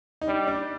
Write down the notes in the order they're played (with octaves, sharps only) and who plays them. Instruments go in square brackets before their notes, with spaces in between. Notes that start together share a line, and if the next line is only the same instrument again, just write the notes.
[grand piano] D#4
[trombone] G3 [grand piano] D4
[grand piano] D4